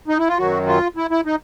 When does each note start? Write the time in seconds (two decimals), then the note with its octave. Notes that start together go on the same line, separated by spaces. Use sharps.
0.08 D#4
0.18 E4
0.28 F4
0.38 F#2 D#3 F#3 F#4
0.67 F4
0.96 E4
1.11 E4
1.26 D#4